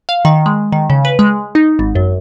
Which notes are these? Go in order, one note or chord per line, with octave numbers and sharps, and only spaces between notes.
F5
D#3
G#3
D#3
C#3
B4
G#3
D#4
G#1
F#2